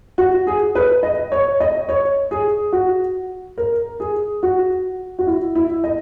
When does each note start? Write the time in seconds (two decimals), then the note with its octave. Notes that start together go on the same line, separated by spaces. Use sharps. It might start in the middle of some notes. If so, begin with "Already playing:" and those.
0.18 F#4
0.47 G#4
0.75 B4
1.03 D#5
1.32 C#5
1.60 D#5
1.89 C#5
2.31 G#4
2.73 F#4
3.58 A#4
4.00 G#4
4.43 F#4
5.19 F#4
5.27 E4
5.55 E4
5.84 D#5